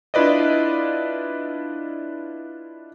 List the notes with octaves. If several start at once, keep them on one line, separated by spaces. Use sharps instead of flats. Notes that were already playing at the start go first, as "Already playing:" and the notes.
D4 E4 F4 B4 D5 D#5